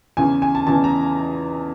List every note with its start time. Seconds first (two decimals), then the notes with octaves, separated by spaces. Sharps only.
0.17 E2 C#3 E3 G#5
0.42 G#5
0.55 A5
0.67 E2 C#3 E3 A5
0.84 A#5